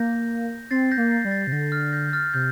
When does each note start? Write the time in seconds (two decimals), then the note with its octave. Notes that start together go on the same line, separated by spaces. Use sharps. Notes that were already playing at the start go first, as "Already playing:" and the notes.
Already playing: A#3 G6 A#6
0.71 C4 A6 C7
0.92 G6 A#6
0.97 A#3
1.11 A6 C7
1.25 G3
1.31 A6 C7
1.46 C3 A6
1.52 D3 G6 A#6
1.72 F6 A6
1.93 G6 A#6
2.08 G6
2.13 F6 A6
2.34 C3 G6